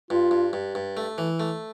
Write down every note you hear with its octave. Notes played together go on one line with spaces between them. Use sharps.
G2 F4
G2
G2
G2
A3
E3
A3